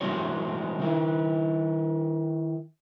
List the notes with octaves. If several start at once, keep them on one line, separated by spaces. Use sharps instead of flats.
E3 G#3 C4 F#4 C#5
D#3 E4